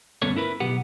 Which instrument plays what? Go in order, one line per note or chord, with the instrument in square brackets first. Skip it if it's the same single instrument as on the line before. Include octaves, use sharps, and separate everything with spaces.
[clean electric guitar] D2 G2 B3 C#4 A4 C#5
E4 A#4 B4
B1 B3 G4 F#5